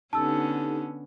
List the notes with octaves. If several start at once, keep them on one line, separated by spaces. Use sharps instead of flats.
D3 B3 C#4 D#4 G4 A4 A5 E6